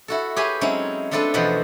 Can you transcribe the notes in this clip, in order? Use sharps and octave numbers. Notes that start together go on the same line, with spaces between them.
E4 F#4 A4
G4 G#4 B4 C#5 E5 G#5
F#3 G#3 C4 C#4 D#4 E4
A3 C4 D4 F4 A4 B4
E2 B2 F3 F#4 B4 C5